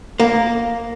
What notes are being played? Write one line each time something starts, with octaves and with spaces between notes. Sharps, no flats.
A#3